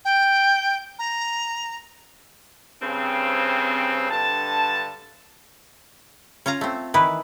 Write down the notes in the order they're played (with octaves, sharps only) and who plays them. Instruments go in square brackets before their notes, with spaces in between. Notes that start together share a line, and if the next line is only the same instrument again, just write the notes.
[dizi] G5
A#5
[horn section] G2 C#3 C4
G2 D3 A5
[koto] C#4 F4 F5 A#5
A3 C4
D#3 E3 E4 B4